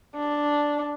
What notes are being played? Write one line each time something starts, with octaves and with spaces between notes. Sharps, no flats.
D4